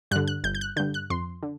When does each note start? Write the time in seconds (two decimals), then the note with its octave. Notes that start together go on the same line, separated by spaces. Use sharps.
0.11 G2 F#6
0.16 D3
0.28 F#6
0.44 G1 G6
0.55 G6
0.61 F#6
0.77 D3 G6
0.80 G2
0.94 F#6
1.10 F2 C6
1.43 D3